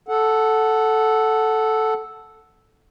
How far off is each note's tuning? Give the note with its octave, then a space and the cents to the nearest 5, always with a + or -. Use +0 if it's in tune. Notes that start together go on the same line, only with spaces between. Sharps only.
A4 -5 F#5 +0